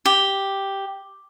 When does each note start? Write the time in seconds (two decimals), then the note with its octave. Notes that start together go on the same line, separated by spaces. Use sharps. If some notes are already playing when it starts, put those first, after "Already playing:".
0.06 G4